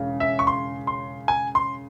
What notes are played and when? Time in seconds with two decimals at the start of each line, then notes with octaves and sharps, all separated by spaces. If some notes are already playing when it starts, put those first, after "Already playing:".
Already playing: E1 C#3
0.20 E5
0.39 C#6
0.47 C6
0.87 C6
1.28 G#5
1.55 C6